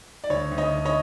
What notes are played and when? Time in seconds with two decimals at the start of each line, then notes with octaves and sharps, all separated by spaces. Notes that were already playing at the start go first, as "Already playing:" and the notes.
0.24 D5
0.30 D2 C#5
0.51 D2
0.58 C#5 D#5
0.72 D2
0.85 C#5 D#5